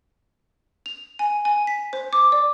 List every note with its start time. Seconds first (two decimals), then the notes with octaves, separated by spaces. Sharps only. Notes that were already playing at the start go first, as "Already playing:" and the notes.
0.86 F7
1.19 G#5
1.45 G#5
1.67 B6
1.93 C5
2.13 D6
2.32 D5